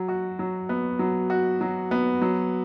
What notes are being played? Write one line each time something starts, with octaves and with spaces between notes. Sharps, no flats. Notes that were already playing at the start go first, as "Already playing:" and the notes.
Already playing: F#3
F#4
F#3
B3
F#3
F#4
F#3
B3
F#3